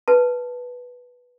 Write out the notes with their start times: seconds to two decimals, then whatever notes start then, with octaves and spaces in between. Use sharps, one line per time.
0.08 B4 A5